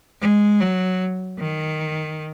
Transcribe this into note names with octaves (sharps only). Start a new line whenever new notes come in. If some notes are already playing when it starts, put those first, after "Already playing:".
G#3
F#3
D#3